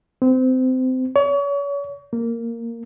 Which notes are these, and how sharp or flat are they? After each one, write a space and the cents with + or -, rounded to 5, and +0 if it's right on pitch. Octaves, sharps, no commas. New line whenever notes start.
C4 -25
C#5 +35
A#3 -10